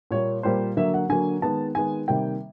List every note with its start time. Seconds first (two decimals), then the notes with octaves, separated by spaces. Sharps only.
0.11 A#2 G3 A#3 C#5
0.43 A#2 G3 A#3 C5
0.77 D3 F#3 A#3 E5
0.94 F#5
1.09 D3 F#3 A#3 G#5
1.42 D#3 G#3 B3 A5
1.75 D#3 G#3 B3 G#5
2.08 C3 D#3 G3 A#3 G5